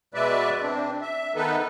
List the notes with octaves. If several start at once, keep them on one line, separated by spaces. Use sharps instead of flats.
B2 G#3 B4 D5 E5
C4 D4
E5
D#3 B3 D#4 A4 B4